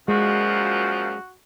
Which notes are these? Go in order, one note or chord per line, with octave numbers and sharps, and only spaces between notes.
F#2 A#2 F3 G#3 F#4